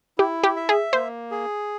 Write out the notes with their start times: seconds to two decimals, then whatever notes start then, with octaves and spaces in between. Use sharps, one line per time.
0.18 E4 G4
0.44 G4
0.56 E5
0.69 G#4
0.93 A#3 C5
1.31 G#4